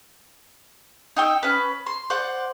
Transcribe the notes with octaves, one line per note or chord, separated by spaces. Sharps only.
D#4 G5 E6
C#4 B4
C6
C5 D5 F#5